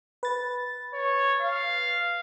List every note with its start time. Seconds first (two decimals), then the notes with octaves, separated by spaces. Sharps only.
0.23 B4 A6
0.94 C#5
1.41 F5